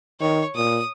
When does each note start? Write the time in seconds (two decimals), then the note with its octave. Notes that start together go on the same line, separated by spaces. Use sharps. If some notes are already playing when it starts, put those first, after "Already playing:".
0.21 D#3 C#5
0.56 A#2 D#6